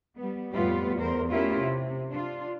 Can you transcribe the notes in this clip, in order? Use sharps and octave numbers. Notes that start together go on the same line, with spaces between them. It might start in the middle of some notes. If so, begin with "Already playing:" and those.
G3 B3
F2 A2 G3 B3 F4 G4
E2 A#4 C5
A3 C#4 E4 F4 G4 A#4
C3
D4 F4